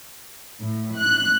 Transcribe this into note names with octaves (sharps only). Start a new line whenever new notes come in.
A2
F#6